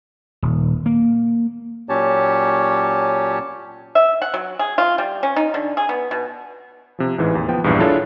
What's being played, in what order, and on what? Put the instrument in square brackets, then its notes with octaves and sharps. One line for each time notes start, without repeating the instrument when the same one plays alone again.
[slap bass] D#1
A#3
[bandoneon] A#2 F#3 C#4 G4 C#5 A5
[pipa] E5
F#5
F#3
G#4
F4
G3
C#4
D#4
D3
G#4
B3
B2
[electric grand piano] C3 F3
A1 G#2 E3
D#2
F3 B3 G5
A#1 E2 G2
D4 E4 F4 G#4 A4 C#5